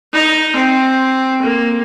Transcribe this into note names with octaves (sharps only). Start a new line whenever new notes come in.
D#4
C4
A#3